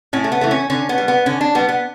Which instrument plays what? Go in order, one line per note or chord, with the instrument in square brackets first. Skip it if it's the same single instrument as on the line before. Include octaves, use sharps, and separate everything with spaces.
[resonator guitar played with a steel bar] A2 C#4
A3
B3
E3 A3
C#4
D3 C#4
B3
G3
B3
D3 C#4
D4
G3 B3
B3